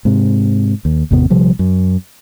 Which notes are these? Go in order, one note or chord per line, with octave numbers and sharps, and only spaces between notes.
G#2 C3
D#2
G#1 E2 C3 B3
A#1 C3 F3 G3
F#2